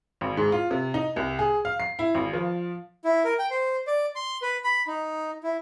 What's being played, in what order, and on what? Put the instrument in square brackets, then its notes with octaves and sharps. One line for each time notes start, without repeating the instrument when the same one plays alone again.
[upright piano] G#1
G#2
F4
C3
D#4
C2
G#4
F5
C7
E4
G#1
F3
[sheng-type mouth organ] E4
A#4
G5
C5
D5
C6
B4
B5
D#4
E4